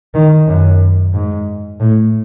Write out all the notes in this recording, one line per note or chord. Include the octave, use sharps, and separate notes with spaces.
D#3
F#2
G#2
A2